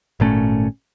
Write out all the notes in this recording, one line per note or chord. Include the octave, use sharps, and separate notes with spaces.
G#1 A#2 A3 C#4